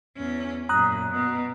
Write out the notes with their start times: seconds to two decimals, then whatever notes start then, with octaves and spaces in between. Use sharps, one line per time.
0.17 E2 C#4
0.69 F#2 A#2 A#5 D#6 F#6
1.11 B2